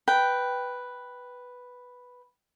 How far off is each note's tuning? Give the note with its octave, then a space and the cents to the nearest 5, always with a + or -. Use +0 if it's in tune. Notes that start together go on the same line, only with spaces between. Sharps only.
B4 +0 G5 -5